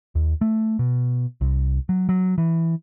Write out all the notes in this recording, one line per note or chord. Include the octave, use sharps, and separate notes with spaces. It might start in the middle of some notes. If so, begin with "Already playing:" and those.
D#2
A3
B2
C2
F#3
F#3
E3